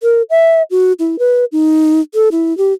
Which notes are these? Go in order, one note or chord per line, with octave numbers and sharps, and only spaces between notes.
A#4
E5
F#4
E4
B4
D#4
A4
E4
G4